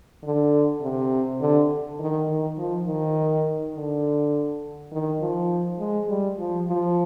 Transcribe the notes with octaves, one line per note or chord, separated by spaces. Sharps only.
D3
C3
D3
D#3
D#3
F3
D#3
D3
D#3
F3
G#3
G3
F3
F3